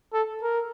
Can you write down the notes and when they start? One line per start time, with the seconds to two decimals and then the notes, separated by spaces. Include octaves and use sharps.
0.14 A4
0.43 A#4